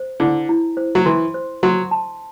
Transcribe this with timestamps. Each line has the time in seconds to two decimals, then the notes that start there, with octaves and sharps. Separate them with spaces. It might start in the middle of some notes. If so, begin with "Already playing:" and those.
Already playing: C5
0.20 D3 E4
0.49 E4
0.77 C5
0.95 F#3
1.06 E3 C6
1.34 C5
1.63 F#3 C6
1.91 A5